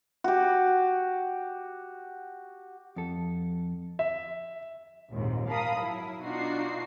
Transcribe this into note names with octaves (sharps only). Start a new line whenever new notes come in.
F#4 G4
F2 A4
E5
A#1 D#2 G#2 C3
A#4 F5 A5 B5 D#6
F#3 E4
B2 D4 D#4 F4 F#4 C7